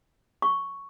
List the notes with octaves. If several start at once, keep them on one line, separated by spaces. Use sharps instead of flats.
C#6